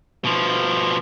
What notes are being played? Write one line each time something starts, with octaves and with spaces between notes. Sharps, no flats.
B2 F3